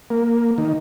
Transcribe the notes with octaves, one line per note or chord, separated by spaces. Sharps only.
A#3
D#3